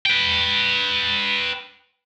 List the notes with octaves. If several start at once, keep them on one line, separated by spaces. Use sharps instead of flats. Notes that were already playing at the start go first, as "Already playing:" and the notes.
B4 G5